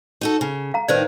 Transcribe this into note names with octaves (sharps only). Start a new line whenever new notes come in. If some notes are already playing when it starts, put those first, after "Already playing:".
D#4 F#4 A4
C#3
F5 A#5
A2 D#3 D#4 B4 C5 D5